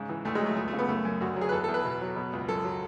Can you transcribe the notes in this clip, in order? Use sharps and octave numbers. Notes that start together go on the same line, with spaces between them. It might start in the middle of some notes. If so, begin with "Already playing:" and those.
Already playing: G#2 C#3
E3
D2 A3
G#3
F#3
A3
C#2 A3
A3
C#3
B3
F#2 A3
F#2
D2 F#4
F#3
G#4
B4
E2 A4
A4
E2
B4
B2
F#3
B2
C#2
F#2 A4
F#3